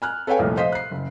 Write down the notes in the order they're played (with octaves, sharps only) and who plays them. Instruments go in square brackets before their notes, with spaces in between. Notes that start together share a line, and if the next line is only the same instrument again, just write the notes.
[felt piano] G#5 F6 F#6
A4 B4 C#5 F5 G5 G#5
C2 F2 A#2 F3 A3
C5 D#5 F5 D#6 B6
F#6 C7
F#1